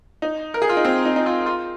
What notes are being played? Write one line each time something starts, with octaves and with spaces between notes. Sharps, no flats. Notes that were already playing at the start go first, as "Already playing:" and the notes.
D#4
A#4
G#4
F4
D#4
C4
D#4
D#4
F4
F4